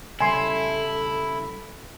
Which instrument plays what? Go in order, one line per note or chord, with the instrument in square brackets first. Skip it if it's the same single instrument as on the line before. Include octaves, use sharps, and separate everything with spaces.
[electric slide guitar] C#3 G3 [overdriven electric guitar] E4 [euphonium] A4 [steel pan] G#5 C6